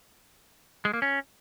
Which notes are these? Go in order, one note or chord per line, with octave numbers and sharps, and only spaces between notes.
G#3
A#3
C#4